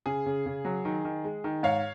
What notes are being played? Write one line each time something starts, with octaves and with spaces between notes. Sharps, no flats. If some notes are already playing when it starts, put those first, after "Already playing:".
C#3 G#4
C#3
C#3
F#3
D#3
D#3
G#3
D#3
G#2 C#5 F5